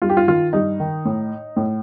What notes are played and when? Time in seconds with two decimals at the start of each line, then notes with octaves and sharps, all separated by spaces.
0.02 G2 F4
0.09 G4
0.17 F4
0.28 D#3 F4
0.53 G2 D#4
0.80 D#3
1.05 A2
1.56 A2